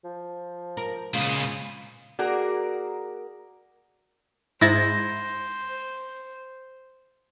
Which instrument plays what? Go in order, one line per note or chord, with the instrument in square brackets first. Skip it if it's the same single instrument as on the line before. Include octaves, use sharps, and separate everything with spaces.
[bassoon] F3
[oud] A#4
[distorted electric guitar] A#2 B3 [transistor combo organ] C#3 G#3 [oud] F4
[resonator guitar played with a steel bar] A#3 F#4 G#4 A#4 D5
[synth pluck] G#2 E4 A6 [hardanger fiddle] C5 [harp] A#6